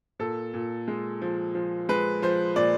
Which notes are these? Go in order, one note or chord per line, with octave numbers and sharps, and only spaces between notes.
A#2 A4
A#2
G#3
F3
F3
G#3 B4
F3 C5
A#2 D5